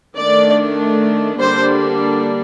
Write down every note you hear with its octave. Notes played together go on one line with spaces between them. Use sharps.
D#3 A3 D4 D5
D3 G3 A#3 D4 C5